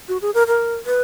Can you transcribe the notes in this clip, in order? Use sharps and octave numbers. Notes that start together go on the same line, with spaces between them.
F#4
G#4
A#4
A#4
B4